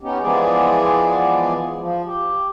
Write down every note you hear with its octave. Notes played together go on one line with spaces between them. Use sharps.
B3 C#4 D#4 G4
E3 F3 G#3 B3 G#4 D5
F3
G4